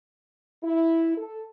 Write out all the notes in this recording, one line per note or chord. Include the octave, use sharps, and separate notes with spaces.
E4
A4